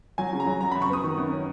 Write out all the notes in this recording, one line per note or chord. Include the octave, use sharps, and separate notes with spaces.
F#3 G#5
C#3
A#5
F#3
F#2 A#5
F#2 B5
C#6
B3 D#6
D#3
F#2
C#4